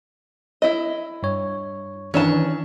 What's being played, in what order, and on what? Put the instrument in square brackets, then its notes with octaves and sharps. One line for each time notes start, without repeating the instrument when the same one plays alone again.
[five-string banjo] E4 D#5
[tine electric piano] G2 C#5
[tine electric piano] D#3 E3 [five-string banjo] C#4 D4 A5